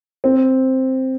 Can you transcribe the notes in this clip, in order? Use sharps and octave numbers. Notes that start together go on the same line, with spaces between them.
C4